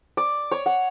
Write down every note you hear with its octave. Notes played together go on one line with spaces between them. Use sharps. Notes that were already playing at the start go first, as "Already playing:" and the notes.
D5
C#5
F#5